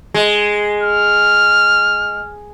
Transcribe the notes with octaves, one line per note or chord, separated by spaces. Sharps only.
G#3
F6